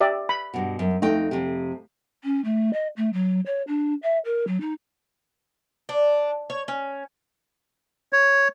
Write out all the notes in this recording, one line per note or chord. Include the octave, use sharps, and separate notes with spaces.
G4 D5 E5
B5
G2 B2
F#2
F2 A3 D#4 G5
F2 C3
C#4
A3
D#5
A3
F#3
C#5
D4
E5
A#4
F#3
D#4
D4
C#5
C#4
C#5